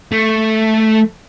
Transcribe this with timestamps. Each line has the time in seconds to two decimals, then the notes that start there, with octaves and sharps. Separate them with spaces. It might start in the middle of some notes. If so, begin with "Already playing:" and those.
0.12 A3